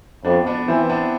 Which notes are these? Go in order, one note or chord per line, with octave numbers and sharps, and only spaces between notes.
F2 B3 D4
B3 D4
E3 C4 E4
B3 D4